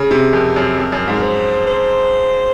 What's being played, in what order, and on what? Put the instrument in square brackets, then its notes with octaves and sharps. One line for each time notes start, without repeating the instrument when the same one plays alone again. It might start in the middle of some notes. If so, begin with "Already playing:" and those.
Already playing: [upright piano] C#3
C3
[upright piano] F2 [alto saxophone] A#4
[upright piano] F#2
F2
F#2
G#2
[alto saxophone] C5
C5